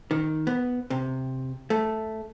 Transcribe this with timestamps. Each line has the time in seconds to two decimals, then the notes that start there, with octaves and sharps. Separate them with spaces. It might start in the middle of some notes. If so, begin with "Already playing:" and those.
0.11 D#3
0.47 B3
0.90 C3
1.70 A3